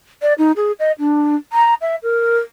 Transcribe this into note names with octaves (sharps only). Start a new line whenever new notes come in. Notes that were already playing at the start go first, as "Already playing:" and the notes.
D5
D#4
G#4
D#5
D4
A#5
E5
A#4